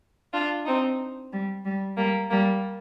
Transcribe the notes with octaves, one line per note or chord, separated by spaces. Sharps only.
D4 F4
C4 D#4
G3
G3
G3 A#3
G3 A#3